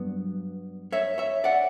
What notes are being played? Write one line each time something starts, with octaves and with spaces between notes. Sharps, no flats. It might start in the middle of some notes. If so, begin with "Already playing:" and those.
Already playing: G2 F#3 B3
C#5 E5
C#5 E5
D5 F#5